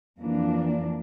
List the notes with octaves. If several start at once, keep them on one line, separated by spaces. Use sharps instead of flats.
F2 E3 A#3 D4